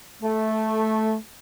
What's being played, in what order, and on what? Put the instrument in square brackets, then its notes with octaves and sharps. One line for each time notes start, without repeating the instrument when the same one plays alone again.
[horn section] A3